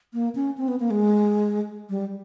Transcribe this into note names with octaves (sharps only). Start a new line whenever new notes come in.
A#3
C#4
C4
B3
A#3
G#3
G3